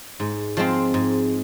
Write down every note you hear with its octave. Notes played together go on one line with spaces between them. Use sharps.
G#2
F3 G#3 C4 F4
G#2